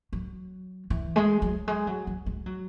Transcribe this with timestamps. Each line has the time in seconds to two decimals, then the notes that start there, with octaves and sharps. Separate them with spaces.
0.13 F#3
0.90 E3
1.16 G#3
1.42 F#3
1.68 G#3
1.87 F#3
2.07 F#3
2.26 G#3
2.46 F#3